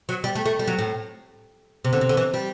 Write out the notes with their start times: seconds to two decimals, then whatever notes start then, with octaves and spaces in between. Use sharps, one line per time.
0.09 F#3
0.24 G3
0.35 A3
0.46 A3
0.59 G3
0.67 F#3
0.78 A2
1.84 C3
1.93 D3
2.01 C3
2.09 D3
2.17 E3
2.34 G3